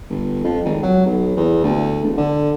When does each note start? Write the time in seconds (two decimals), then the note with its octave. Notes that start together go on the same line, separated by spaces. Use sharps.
0.09 G1
0.44 F2
0.65 G#1
0.83 F#3
1.06 B1
1.37 E2
1.63 D2
2.04 E1
2.17 D3